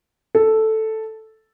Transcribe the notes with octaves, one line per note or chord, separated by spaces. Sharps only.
A4